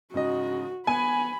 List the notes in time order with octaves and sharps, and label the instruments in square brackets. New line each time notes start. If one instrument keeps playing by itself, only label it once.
[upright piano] G#2 C#3 D#5 [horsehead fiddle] F#4
[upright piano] B3 [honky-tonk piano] G#5 [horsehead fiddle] B5